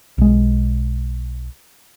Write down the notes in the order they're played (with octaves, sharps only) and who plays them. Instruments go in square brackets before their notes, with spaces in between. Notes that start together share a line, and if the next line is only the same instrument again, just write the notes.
[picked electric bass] B1 G#3